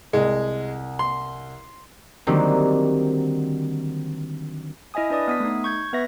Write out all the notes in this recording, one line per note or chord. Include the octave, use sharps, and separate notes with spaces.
C2 G#3
C6
D3 D#3 F#3 G3 A#3 C4
E4 D#5 E5 G#5 D#6
D4 B4 D5 D#6
B3 D#6 B6
A3 D#4
C#6 G6 G#6
B3 B4 E5 A#6